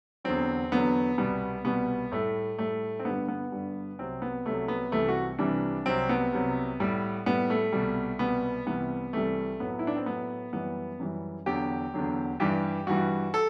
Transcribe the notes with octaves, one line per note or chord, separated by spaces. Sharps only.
E2 D3 F#3 C4
E2 D3 F#3 B3
C2 B2 G3 B3
C2 B2 G3 B3
A2 G3 A3
A2 G3 A3
C4
G2 D3 G3 B3
B3
G2 D3 G3
C2 C3 F#3 C4
B3
C2 C3 F#3 A3
B3
C2 C3 E3 G3 A3
F#4
C2 C3 E3 G3 D4
C2 C3 F#3 C4
B3
C2 C3 F#3
A2 G3
A2 G3 B3
A3
C2 B2 G3
C2 B2 G3 B3
C2 C3 E3 G3 B3
C2 C3 E3 G3 A3
A2 F#3 B3
E4
D4
C4
A2 F#3 B3
F#2 E3 G3 B3
F#2 E3 G3
E2 D3 F#3 G4
E2 D3 F#3
G2 E3 G3 G4
G2 E3 G3 F#4
A4